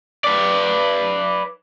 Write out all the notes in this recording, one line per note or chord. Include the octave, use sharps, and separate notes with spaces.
B4 D5